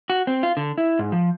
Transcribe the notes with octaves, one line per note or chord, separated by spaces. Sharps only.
F#4
C4
F4
D3
E4
G#2
F3